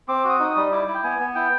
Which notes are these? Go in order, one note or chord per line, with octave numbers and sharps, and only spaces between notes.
C4 D6
F#4 D#6
D#4
D#6
G3
E4 D6
E4
G5
B3 G#5
B3
E4 G5